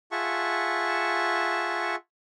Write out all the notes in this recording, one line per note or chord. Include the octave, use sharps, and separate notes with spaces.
F4 G#4 E5 F#5 A5 C#6